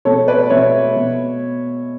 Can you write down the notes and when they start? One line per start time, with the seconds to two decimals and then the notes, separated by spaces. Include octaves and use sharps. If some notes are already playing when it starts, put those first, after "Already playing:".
0.05 B2 A4 C#5
0.28 B4 D5
0.50 B2 C#5 E5
0.96 B2